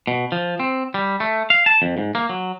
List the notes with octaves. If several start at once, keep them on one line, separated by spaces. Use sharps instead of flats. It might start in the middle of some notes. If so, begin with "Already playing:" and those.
B2
F3
C4
G3
A3
F5
A5
F2
G#2
A#3
F#3